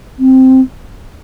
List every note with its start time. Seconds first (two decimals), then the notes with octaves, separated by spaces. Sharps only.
0.19 C4